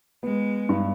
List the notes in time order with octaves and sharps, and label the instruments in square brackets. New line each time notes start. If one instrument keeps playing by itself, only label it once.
[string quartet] G#3 [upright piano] B3
[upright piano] G2